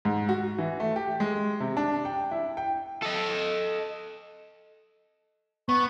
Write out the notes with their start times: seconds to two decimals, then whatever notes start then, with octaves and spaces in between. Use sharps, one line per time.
0.05 G#2
0.29 F#4
0.58 E3
0.80 A3
0.96 G4
1.20 G#3
1.60 C3
1.77 D4
2.05 G5
2.31 E4
2.57 G5
3.02 A4 D#5
5.69 B3 C#6